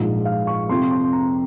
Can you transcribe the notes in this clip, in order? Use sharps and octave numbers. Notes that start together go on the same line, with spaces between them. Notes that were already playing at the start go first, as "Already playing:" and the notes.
Already playing: A#1 G#2 F3
F5
C#6
F2 C3 F3 C6
C6
A#5